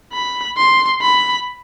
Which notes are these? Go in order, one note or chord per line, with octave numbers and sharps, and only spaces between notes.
B5
C6
B5